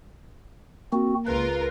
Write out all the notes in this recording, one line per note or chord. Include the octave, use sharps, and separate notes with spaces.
A#3 C4 F#4
C#2 F4 A#4 B4